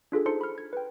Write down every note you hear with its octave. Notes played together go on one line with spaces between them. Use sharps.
D4 F4 G#4 A4
D#4 A4 C5 A5 C6 C#7
B5 F6
G#6
B4 G5